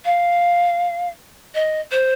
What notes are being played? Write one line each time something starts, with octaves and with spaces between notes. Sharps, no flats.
F5
D#5
C5